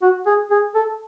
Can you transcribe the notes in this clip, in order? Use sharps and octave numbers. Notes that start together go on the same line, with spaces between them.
F#4
G#4
G#4
A4